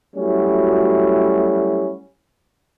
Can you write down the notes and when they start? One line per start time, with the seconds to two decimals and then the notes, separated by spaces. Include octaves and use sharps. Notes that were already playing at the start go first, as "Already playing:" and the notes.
0.16 F#3 G3 A3 C#4 E4 F#4